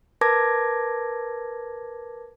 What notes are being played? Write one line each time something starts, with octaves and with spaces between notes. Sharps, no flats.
A#4 B4 A5 D6 G#6 A#6